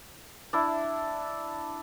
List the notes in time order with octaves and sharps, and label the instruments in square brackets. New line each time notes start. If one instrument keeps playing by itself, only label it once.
[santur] D4 E4